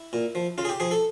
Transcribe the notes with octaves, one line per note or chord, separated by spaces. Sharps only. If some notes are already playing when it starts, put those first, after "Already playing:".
Already playing: E4
A#2
F3
C#3 F4
G#4
G4
F3 G#4
A4